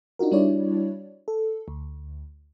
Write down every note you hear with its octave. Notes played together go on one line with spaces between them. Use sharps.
D4 D#4 F4 F#4 A#4
G3 D4 E4 F#4 C#5 D5
A4
D2